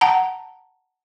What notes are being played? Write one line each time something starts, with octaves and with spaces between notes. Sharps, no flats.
F#5 A5 A#5